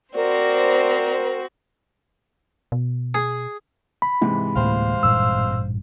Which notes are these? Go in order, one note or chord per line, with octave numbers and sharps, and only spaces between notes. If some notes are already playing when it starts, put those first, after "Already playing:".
C4 F#4 A#4 C5 D5
B2
G#4
B5
G#2 C3 E3
D2 A2 A#3 C5 F5
A1 G2 A#2 E6